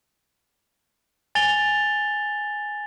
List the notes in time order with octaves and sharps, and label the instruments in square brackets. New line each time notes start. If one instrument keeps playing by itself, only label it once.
[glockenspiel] G#5 A6 F7 G7